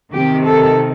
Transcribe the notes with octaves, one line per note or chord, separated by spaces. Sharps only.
C3 D#3 G4
A4